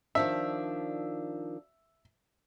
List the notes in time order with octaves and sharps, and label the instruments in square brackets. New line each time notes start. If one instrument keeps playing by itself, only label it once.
[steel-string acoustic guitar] D#3 F3 D4 [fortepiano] E5